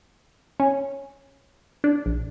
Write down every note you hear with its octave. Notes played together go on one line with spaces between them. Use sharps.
C#4
D4
A#1